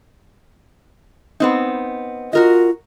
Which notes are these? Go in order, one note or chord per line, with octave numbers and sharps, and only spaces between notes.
B3 C4 D#4
F4 F#4 A#4 D#5